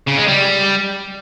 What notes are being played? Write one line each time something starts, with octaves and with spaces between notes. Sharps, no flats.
C#3
G#3
G3